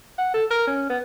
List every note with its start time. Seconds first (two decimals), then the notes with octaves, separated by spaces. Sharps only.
0.18 F#5
0.34 A4
0.50 A#4
0.67 C#4
0.90 B3